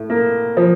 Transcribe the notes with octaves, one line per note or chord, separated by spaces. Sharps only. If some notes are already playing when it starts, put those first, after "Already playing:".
Already playing: A2
A#3
F3